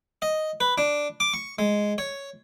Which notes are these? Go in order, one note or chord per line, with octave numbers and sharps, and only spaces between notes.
D#5
B4
D4
D6
C#6
G#3
C#5